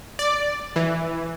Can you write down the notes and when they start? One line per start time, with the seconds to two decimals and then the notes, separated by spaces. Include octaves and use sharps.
0.19 D5
0.76 E3